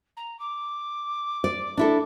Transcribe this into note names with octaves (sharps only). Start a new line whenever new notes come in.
A#5
D6
D5
D4 E4 A4